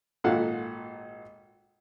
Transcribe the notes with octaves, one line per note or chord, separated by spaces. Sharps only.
G#1 A#2 A4 F5 F#5